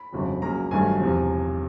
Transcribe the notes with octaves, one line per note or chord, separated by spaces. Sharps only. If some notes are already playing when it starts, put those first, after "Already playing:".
Already playing: B5
G1 F2 C#3 F#3
C#2 C#3 F#3 A#3 A#5
G#1 G2 D#3 F#3 A3 G#5
E1 E2 C3 F3